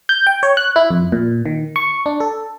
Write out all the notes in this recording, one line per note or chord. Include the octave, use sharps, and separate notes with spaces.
G6
G5
C#5
F#6
E4
F2
A#2
D#3
C#6
D4
A4